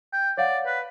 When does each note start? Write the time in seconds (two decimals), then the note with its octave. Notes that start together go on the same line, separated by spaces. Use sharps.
0.13 G5
0.38 C#5 D5 F5 F#5
0.66 B4